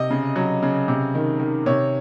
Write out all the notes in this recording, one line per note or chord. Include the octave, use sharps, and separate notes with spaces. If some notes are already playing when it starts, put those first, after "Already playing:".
Already playing: C3 D#5
C#3
F#3
C#3
C3
D#3
D#3
C3 C#5